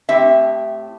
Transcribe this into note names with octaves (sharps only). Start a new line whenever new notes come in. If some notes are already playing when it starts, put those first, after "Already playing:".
A2 C4 G4 E5